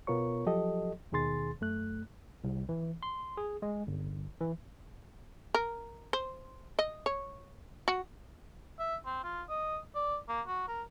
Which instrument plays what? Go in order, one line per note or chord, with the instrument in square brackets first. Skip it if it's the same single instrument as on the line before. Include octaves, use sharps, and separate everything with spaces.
[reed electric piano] B2 B3 F4 A#4 C#5 C#6
F3 F#3 G4 A4 D#5
D#2 B2 D#3 G#4 C6 A6
F#2 A3 F#6
[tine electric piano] C2
E3
C6
G#4
G#3
G1
E3
[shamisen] A#4
C5
D#5
C#5
F#4
[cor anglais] E5
C4
F4
D#5
D5
A#3
F#4
A#4